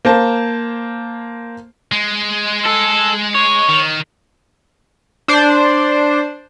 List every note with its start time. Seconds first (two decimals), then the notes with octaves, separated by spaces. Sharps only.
0.05 A#3 C5 A5
1.92 G#3
2.66 A4
3.35 C#5
3.69 D#3
5.28 D4 C5